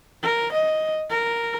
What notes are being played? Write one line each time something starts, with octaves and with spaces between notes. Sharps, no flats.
A#4
D#5
A#4